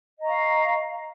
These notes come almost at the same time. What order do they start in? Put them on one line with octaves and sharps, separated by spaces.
D#5 A#5 C#6 F5